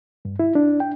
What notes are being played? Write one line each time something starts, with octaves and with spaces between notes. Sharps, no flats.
G2
E4
D4
G5